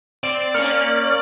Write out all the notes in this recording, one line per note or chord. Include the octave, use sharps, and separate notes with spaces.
C4 D5
A#3 C#4 F6 C#7